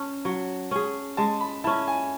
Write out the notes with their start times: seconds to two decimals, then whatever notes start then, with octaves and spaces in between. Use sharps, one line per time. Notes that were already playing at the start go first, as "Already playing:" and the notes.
Already playing: C#4 A5
0.25 F#3
0.71 C#4 G#4
1.17 G#3 A5
1.41 B5
1.64 C#4 E4 A5
1.88 G#5